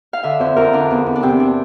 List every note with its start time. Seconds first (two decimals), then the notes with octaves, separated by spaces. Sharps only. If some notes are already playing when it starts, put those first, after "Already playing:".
0.13 F5
0.23 D3 E5
0.40 F2 C5
0.56 F2 A#4
0.73 D3 D4
0.91 E2
1.06 E2
1.16 D4
1.22 C3 C4
1.40 D4